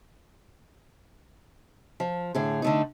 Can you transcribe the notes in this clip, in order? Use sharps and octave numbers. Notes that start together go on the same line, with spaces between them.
F3
A2 D3 G#4
D3 A3 D#4